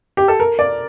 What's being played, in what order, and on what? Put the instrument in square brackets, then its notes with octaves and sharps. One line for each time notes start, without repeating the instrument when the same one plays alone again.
[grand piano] G4
A4
A#4
D5